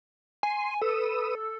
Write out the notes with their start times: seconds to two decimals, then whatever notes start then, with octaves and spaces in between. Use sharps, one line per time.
0.43 G#5 C6
0.82 A4 B4 D#6 E6